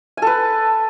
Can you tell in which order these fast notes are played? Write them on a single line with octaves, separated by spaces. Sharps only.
G#5 A4 B4